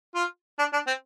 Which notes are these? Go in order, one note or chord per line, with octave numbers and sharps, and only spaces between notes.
F4
D4
D4
C4